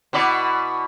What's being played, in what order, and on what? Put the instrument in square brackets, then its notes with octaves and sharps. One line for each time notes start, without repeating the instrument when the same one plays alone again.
[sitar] B2 E4 D5